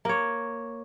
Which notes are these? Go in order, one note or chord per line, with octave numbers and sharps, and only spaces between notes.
A#3 C#5